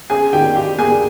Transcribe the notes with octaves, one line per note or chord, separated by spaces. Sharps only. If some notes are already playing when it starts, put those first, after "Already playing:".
C#4 G#4 G#5
D#3 G4 G5
D#3 G4 G5
A#3 G#4 G#5